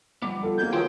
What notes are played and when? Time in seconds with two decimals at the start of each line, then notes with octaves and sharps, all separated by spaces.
0.22 F3 G3 B3 D#4 D6
0.43 F4 A4
0.58 A#3 C4 D#4 F#4 G#4 G6 G#6
0.73 D#3 F3 F#3 F4 F#4 B4 G5 C6